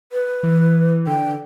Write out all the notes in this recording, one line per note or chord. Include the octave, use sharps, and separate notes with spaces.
B4
E3
D3 G5